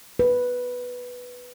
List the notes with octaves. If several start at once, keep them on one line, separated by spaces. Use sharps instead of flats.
B4